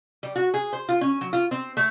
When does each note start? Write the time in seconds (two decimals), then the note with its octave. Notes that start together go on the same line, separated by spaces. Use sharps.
0.23 G3
0.36 F#4
0.54 G#4
0.73 C5
0.89 F4
1.01 C#4
1.21 F#3
1.33 F4
1.51 C4
1.77 A3